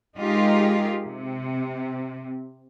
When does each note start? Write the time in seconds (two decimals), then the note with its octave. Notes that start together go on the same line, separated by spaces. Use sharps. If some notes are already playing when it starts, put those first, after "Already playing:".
0.16 G#3 D#4 F4 G4 G#4 A#4
1.02 C3